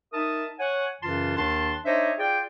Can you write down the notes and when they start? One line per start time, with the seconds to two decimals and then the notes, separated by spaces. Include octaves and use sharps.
0.13 D#4 A#4 E5 A5 D#6
0.59 C#5 F#5 G#5
1.02 F#2 C#3 E3 F4 A5 C6
1.37 D#2 D#3 D4 A5 C6
1.85 D4 D#4 C5 C#5 D#5 E5
2.19 F4 G#4 D5 G5